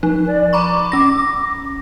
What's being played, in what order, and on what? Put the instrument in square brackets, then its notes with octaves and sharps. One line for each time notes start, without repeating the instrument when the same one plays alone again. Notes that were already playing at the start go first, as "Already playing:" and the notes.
[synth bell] F3 D#4 [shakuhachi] B4
[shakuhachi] D5
[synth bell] A#5 B5 C#6 [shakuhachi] D6
[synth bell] C#4 A#6